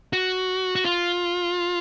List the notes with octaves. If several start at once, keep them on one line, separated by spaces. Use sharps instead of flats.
F#4
F#4
F4